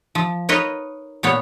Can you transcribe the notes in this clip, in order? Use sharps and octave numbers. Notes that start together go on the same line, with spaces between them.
F3
D#4 A#4 B4 C#5 D#5
A#2 B3 C#5